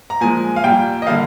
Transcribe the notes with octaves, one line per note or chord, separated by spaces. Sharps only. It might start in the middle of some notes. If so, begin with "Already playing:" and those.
A#5
A#2 F3 G#3 G#5
F5
A#2 G3 A#3 G5
D#5
D3 G3 A#3 F5